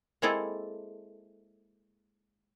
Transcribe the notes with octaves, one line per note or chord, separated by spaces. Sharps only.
G#3 A#3 C4 E4 G#4 A4